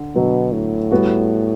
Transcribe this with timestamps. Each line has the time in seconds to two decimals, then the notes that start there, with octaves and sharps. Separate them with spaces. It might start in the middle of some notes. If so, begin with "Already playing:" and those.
Already playing: D3
0.15 B2 D3 F#3 B3
0.53 A2
0.91 G3 B3 F#4